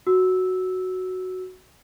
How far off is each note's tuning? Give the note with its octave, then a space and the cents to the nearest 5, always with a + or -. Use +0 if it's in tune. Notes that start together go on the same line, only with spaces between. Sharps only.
F#4 +0 E6 -10